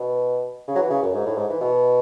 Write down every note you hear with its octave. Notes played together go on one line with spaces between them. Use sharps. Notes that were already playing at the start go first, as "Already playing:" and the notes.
Already playing: B2
C#3
F#3
E3
C#3
F#2
G#2
A2
G#2
E3
B2